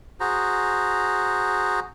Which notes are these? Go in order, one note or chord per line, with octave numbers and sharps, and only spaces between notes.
F#4 G#4 C5 A#5